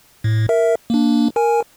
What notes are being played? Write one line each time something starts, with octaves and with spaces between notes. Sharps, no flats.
A2
A#4 E5
A#3 D4
A#4 G#5